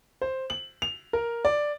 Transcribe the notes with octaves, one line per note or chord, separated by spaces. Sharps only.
C5
F#7
F7
A#4
D5